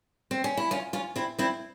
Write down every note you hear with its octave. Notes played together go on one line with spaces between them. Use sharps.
C4
C#4
E4
C#4 F4
C#4 F4
C4 E4
C4 E4